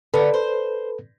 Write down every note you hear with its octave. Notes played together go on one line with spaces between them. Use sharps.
D3 B3 A4 B4
C5